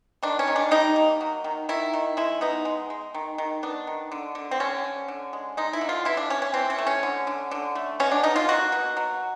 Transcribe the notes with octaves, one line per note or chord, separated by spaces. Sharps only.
D#3 D4
C#4
D#3
D4
G3 D#4
A#3
F#3
D#3
D#3 E4
D#3
G#3 E4
B3 D#4
G#3
G#3
D#3
D#3
B3 D4
D#3
D3
D3
C4
D3 C#4
D3
D3
G#3
G#3 D#4
E4
D3
F4
E3 E4
D4
E3 C#4
C#4
E3 C4
C#4
A3
C#4
D3
D3
D3
A3
B2 C#4
D4
B2 D#4
F4
A#3 F#4
B2
F#3